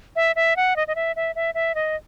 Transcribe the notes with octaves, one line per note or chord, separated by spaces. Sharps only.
E5
E5
F#5
D#5
D#5
E5
E5
E5
E5
D#5